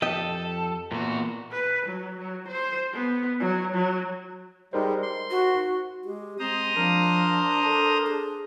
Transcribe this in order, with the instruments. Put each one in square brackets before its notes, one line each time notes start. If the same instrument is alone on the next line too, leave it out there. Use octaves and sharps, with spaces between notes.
[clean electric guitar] F2 G4 G5 [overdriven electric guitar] A4 [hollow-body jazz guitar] D#5
[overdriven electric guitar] E2 F#4 [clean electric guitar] A#2
[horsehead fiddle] B4
F#3
F#3
C5
B3
F#3
F#3
[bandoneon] G3 G#3 [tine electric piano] D#4 A#4 C5
[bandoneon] C6
[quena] F#4
[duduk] G#3 [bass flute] G4
[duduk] G#3 [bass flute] C4 [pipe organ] C5 A#5 D#6
[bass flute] F3 [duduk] D4 [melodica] A#4
[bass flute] A4
G#4